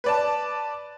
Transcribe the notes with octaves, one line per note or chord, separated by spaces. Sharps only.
B4 D5 A5